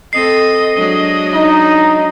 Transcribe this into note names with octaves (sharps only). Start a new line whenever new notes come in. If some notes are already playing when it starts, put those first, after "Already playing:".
C4 A4 D#5 C7
F#3 G#3 D4
D#4